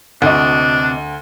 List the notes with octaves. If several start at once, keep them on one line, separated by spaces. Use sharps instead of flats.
D2 C3 D4 D#5